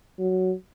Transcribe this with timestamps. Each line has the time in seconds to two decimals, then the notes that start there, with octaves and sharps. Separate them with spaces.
0.19 F#3